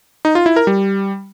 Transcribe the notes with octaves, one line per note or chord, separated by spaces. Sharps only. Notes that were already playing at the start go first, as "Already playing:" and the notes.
D#4
F4
E4
A#4
G3